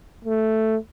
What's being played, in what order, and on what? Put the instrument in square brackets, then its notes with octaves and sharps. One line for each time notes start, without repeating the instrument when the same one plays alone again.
[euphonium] A3